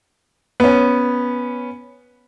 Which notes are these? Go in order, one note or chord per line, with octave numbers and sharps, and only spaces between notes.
B3 C#4